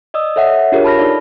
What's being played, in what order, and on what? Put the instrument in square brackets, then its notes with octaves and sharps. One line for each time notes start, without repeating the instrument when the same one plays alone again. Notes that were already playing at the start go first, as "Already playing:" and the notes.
[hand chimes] D5 D#5 D#6 E6
A4 C#5 E5 F#5
D4 F4 G4 G#4 A#4 C#5
A5 B5 F6 A#6
D#4 A4 D5 F5